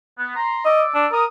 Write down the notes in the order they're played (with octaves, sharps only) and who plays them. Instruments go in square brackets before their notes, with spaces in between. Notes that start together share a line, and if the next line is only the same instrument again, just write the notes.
[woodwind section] B3
A#5 C6
[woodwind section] D5 D6 E6 [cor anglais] D#5
[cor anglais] D4
[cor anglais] A#4 [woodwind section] D#6